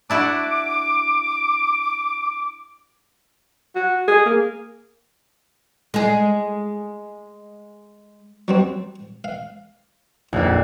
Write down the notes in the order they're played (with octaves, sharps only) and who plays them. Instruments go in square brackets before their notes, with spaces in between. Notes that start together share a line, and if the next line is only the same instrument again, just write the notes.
[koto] D4 E4 F#4 [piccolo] D6
[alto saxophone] F#4
G#4
A#3
[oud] G#3 G#4
[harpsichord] F#3 G3 C4
F5
[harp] A#1 F2